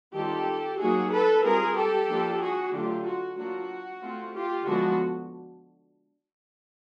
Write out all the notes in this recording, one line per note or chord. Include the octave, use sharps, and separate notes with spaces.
D#3 G3 C4 F4 G4 A4
F#3 A#3 D#4 F#4 G#4
A4 B4
G3 C4 F4 G#4 A#4
G4 A4
F3 A#3 D4 F4
F#4 G#4
D3 F#3 A3 D4 F4 G4
F#4
F#3 A#3 D4 F4 F#4
A3 C4 F4
F4 G4
D3 F3 G#3 B3 D4 F#4